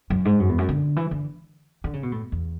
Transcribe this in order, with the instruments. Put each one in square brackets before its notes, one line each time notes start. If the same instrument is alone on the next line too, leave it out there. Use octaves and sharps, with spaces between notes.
[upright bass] F#2
G#2
F#2
E2
F#2
D3
E3
D3
D3
C#3
B2
A2
E2